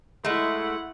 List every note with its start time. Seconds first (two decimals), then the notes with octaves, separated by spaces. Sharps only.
0.24 G#3 A3 E4 F#5